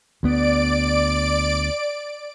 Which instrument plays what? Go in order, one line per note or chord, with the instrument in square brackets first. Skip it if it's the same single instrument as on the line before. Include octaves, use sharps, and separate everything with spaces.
[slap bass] D2 B3 [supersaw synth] D5 D7